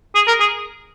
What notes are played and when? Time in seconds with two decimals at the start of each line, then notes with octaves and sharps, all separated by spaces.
0.15 G#4
0.27 A#4
0.40 G#4